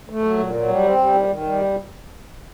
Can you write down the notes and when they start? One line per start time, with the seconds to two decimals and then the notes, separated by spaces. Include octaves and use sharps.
0.10 A3
0.24 F#3
0.38 A#2
0.54 F#3
0.68 G3
0.83 C4
0.98 G3
1.14 D#3
1.28 D#3
1.43 G3